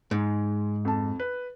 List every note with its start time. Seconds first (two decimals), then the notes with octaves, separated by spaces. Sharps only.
0.11 G#2 G#3
0.85 F2 A5
1.19 B4